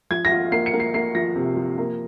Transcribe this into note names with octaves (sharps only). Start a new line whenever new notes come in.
F3 G#6
A#6
F4
A#3 C7
C#7
A#3
C7
A#3 C7
F3 A#6
C3
F3
A#3